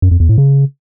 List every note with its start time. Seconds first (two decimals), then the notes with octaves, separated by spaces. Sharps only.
0.02 F#2
0.11 F2
0.20 E2
0.29 A2
0.38 C#3